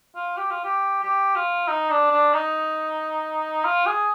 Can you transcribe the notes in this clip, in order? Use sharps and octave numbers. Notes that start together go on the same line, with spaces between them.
F4
G4
F4
G4
G4
F4
D#4
D4
D4
D#4
F4
G#4